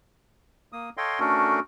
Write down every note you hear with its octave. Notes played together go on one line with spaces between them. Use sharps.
A#3 D#6
A4 C#5 D#5 F5 G5 C6
A3 C#4 D4 F#4 A4 A#4